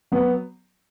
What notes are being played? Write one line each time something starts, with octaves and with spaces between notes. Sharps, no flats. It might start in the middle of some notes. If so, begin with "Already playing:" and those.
F#3 B3